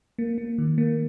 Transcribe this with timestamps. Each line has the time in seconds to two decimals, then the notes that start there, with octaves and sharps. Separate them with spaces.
0.18 A#3
0.38 A#3
0.58 D#3
0.78 A#3